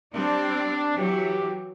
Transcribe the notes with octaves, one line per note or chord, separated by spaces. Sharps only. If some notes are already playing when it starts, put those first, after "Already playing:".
G3 C4 D4 D5
E3 F#3 G4